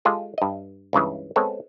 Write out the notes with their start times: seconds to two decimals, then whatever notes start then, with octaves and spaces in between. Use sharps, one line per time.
0.05 G#3 F4 G4 A4
0.38 G2 D#5
0.93 C#2 G2 C#3 E3
1.36 G#3 B3 C4 A4 C#5